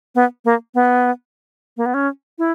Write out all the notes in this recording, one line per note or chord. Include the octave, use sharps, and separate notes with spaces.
B3
A#3
B3
A#3
B3
C#4
E4